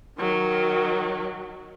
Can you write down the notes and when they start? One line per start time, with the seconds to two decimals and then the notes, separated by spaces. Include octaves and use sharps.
0.18 D#3 F#3